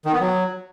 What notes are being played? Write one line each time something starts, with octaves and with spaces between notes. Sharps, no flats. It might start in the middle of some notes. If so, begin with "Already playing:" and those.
D#3
B3
F#3